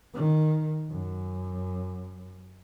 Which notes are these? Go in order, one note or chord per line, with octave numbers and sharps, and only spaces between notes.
D#3
F#2